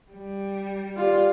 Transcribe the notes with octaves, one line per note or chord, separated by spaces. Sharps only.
G3
F4 G4 D5